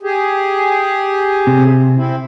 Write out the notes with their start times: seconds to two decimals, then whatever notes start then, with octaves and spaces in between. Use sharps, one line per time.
0.03 G4 G#4
1.47 C3
1.96 C4 E4